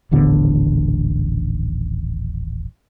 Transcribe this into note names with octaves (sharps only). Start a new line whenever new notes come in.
D#1 A1 D3 B3